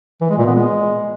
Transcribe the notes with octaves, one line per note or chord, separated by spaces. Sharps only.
E3
G#3
A#2
B3
G#3